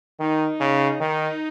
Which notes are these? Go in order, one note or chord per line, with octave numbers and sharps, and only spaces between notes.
D#3 D#4
C#3
D#3 D#4